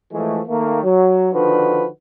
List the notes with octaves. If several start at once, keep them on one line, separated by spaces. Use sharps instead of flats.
E3 F3 G#3 A3
D#3 A3 A#3
F#3
D3 D#3 F3 D4 F#4 B4